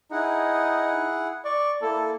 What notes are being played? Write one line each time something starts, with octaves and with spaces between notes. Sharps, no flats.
D#4 E4 G#4 F#5
D5 C#6
A#3 E4 A4